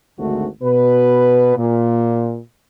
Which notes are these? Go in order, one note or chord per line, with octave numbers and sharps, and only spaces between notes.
G#1 D2 G#2 D3 A3 F#4
B2 B4
A#2